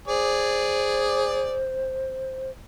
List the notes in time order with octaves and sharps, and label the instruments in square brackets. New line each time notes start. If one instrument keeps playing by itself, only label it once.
[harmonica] G#4 D5 [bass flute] C5